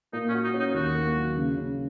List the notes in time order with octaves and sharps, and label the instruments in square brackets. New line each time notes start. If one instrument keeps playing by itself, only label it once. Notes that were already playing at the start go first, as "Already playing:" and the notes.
[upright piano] A#2 [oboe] D#4
[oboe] C#4
[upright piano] F#4
[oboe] D#4
[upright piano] C#4
[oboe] D#4
[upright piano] D#2 [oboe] F#4
[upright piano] A#3
F#3
C#3
C#3